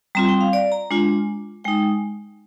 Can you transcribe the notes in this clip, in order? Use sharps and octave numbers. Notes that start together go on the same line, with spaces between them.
G3 C4 F4 A#5
G5
F5
D5
A#5
G#3 D4 F4
G#3 D#4 G5